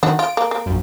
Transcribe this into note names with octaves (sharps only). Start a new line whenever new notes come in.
D#3 D4 F#4
F4 D7
A#3
A#3
A#1 F#2